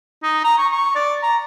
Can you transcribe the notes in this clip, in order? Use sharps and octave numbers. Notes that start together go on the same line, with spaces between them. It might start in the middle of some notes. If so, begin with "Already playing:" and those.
D#4
A#5
C#6
C#6
D5
A#5